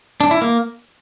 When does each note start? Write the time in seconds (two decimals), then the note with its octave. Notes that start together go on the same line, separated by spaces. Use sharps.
0.21 D4
0.31 E4
0.42 A#3